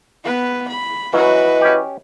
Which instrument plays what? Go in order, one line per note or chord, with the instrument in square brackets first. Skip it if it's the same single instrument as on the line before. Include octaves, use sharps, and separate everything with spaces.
[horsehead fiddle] B3 B4
B5
[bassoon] E3 [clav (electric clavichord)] F#3 C#4 [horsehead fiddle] F#4 B4 [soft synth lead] D#5
[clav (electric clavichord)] C#4 G4